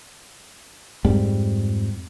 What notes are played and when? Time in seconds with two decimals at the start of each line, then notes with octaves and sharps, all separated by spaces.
1.05 F2 G#2 G3